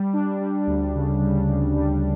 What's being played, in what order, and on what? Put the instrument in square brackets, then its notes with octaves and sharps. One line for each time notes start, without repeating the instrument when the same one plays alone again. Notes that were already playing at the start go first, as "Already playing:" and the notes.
Already playing: [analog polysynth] G3
D4
G3
D2
C#3
G3
C#3
G3